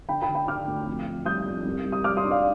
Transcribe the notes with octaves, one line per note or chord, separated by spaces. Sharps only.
D3 G5 B5
G5 B5
D3
G5 B5
D3 D6 F6
D2
F2
F2
G3 D#6 G6
F2
C2
G3
D#6
G3 D6 F6
C6 D#6
D4
D5 F5